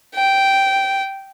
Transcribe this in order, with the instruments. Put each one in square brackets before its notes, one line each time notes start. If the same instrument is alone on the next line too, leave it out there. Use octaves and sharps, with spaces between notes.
[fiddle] G5